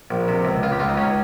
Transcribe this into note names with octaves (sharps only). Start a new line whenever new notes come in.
A#1
C3
C#2
C#2 F4
G4
C#2 F4
D#4
C#2 C#4